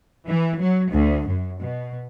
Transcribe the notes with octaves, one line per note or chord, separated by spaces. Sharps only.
E3
F#3
D2
F#2
B2